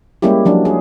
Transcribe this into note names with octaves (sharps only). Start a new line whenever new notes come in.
G3 G#3 A#3 C#4 E4 G4
F3 F#3 D4
G#4